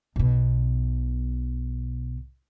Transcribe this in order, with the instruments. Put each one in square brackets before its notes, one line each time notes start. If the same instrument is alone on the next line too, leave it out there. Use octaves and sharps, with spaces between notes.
[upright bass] B1 B2